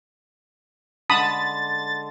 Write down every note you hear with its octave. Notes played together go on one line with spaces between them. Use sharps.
D3 G#3 A5 B5 D#6 A6